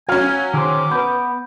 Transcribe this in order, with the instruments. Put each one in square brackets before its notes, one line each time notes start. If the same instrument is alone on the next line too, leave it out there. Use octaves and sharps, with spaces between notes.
[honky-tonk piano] F#3 C#4 [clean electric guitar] F5 [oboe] G#5
[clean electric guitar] D#3 G#4 C5 [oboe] D6
[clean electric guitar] B3 [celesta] B4 G6